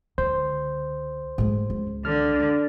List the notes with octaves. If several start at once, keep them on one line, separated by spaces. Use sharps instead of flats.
C#2 D3 C5
G#2 A3
C#2
D3 F6